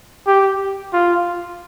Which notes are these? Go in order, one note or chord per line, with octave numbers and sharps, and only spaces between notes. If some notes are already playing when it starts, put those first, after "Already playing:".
G4
F4